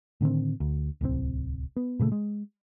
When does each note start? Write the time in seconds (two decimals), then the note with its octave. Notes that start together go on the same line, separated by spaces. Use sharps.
0.21 A2 D3 D#3 C4
0.60 D2
1.01 D1 C2 A#2 C4
1.76 B3
1.99 A#2 C#3 F3 A3
2.12 G#3